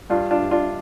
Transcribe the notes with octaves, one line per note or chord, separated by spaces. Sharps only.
G2 D4 F4
D4 F4
G2
D4 F4